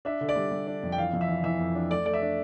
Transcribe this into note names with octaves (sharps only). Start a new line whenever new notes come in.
D4 E5
D3
D5
G3
G3
D4
F2
G5
E3 F5
F2
E5
E3
E3 E5
F2
D4
A3 D5
A3 D5
E5
D4